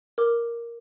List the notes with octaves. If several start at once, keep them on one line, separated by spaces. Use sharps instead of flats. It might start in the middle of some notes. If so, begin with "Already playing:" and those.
A#4 D6